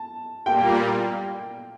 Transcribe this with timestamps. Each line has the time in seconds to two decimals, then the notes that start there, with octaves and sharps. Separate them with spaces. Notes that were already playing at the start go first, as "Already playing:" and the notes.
Already playing: A5
0.46 A#2 G3 A#3 G5